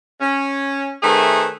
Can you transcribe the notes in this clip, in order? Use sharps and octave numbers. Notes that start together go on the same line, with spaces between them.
C#4
D#3 A3 C4 G#4 B4 E5